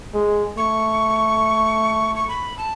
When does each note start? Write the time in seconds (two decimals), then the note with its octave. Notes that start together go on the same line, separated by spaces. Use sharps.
0.14 G#3
0.57 A3 C#6
2.15 C#6
2.28 B5
2.58 A5